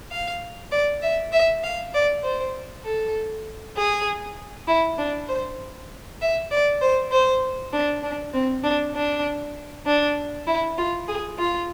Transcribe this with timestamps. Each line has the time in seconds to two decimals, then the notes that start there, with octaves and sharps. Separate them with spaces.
0.11 F5
0.72 D5
1.02 E5
1.32 E5
1.64 F5
1.94 D5
2.24 C5
2.85 A4
3.77 G#4
4.67 E4
4.98 D4
5.28 C5
6.21 E5
6.51 D5
6.82 C5
7.12 C5
7.73 D4
8.03 D4
8.34 C4
8.64 D4
8.95 D4
9.86 D4
10.47 E4
10.78 F4
11.08 G#4
11.39 F4